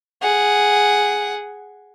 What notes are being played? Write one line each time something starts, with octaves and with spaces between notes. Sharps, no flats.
G#4 F#5